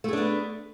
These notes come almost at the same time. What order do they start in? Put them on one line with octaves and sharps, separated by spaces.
A3 G#4 D4 B3